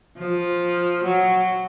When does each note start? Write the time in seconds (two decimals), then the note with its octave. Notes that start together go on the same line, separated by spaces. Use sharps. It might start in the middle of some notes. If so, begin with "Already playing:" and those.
0.18 F3
1.04 F#3